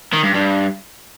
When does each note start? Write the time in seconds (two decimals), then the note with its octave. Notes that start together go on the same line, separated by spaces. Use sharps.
0.13 D#3
0.23 G2
0.34 G2